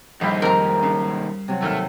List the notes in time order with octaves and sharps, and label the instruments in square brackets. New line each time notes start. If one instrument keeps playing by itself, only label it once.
[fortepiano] A#1 G4 B5 [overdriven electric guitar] D#2 G#2 [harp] G3
[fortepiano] F2 C4 [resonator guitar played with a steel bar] A#4 A#5
[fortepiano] C#3
[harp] C3 F#3
[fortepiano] D#2 F6 [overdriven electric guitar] A3